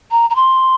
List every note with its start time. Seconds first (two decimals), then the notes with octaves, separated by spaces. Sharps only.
0.11 A#5
0.30 A#5
0.35 C6